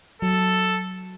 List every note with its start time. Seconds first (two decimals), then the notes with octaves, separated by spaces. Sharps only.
0.22 F#3 A4